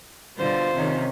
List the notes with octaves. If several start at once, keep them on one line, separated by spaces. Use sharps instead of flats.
B2 D3 G3 F4 C5
C3 D#3 C#4